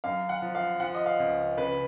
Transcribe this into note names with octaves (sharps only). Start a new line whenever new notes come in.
F#2 F5
F#5
F3
F5
F3 F#5
D#5
F5
C#2
C#3 B4